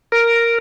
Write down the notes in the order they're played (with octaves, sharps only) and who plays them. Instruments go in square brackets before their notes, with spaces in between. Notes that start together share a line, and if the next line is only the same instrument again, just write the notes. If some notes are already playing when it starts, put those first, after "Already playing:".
[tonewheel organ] A#4